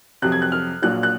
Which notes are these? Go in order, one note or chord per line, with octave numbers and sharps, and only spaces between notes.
F2 C3 F#3 F#6
G#6
F#6
F6
A#1 A#2 F#3 F#6
F#6